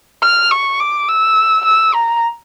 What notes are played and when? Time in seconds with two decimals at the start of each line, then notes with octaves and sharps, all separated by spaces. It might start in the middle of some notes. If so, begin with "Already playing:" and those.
0.22 F6
0.51 C#6
0.80 D6
1.08 E6
1.65 E6
1.94 A#5